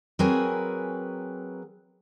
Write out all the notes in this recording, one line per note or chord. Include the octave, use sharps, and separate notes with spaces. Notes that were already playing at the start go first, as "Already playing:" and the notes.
F#3 C4 G#4 A#4 B4 G#5